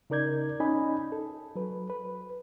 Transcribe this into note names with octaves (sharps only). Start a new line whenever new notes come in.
C#3 D#4 A#4 D5 G6 G#6
C#4 D#4 D#5 G#5 B5
A4
F#3 B4
B4